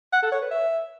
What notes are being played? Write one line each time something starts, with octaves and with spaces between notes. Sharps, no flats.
F#5
A4
C#5
B4
E5